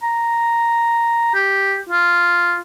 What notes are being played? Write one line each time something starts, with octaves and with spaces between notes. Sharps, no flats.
A#5
G4
F4